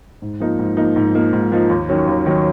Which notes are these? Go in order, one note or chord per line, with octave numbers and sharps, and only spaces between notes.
G#2
F3 A#3 D#4
G#2
F3 A#3 D#4
G#2
F3 A#3 D#4
G#2
F3 A#3 D#4
D#2
D#3 F#3 C#4
D#2
D#3 F#3 C#4